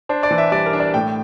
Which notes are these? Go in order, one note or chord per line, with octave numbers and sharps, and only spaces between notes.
D4 C5
D5
E3
E5
G3 D5
A#4
D4
D5
A2 G5